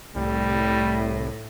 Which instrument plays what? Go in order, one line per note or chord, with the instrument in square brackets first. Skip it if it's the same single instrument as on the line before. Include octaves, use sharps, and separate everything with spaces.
[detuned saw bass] C2 [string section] A2 [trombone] G3